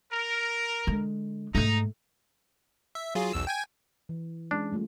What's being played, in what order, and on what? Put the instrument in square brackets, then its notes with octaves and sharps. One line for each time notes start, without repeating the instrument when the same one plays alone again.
[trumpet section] A#4
[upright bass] D3 G#3
[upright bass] G#2 A3 [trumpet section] D#4 A#5
[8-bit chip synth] E5
F#3 F4 G#4
B1 E2 E6
G5 G#5 G#6
[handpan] E3
[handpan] G#3 C#4 G#4 [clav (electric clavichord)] D4
[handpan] G3 A3 F4